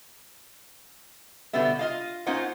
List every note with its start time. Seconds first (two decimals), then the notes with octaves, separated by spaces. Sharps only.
1.53 B2 D3 G3 B3 E5
1.79 F4 D#5 F5
2.27 A#3 C#4 D#4 F4 C5 F#5